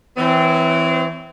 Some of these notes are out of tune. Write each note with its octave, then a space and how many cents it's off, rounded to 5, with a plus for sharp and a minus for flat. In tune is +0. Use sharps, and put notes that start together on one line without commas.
E3 +0 C4 -30 C#5 +0